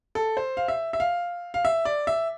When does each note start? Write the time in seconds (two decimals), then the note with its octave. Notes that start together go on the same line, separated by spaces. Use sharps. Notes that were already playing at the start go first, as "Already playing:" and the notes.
0.15 A4
0.37 C5
0.57 F5
0.68 E5
0.93 E5
1.00 F5
1.54 F5
1.65 E5
1.85 D5
2.07 E5